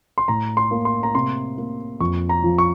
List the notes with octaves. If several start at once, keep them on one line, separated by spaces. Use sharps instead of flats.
C6
A2 A#5
C6
A#3
C6
A#5
C3 C6
A#3
F2 C#6
A#5
F3
C#6